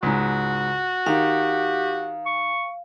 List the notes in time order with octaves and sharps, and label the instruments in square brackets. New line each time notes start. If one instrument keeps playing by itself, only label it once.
[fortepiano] C#2 G#2 [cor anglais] F#4
[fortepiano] D#3 [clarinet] G4 [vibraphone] F5
[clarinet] C#6